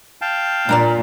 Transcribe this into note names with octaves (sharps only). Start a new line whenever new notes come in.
F5 G5 A5
A#2 D4 A#4 D5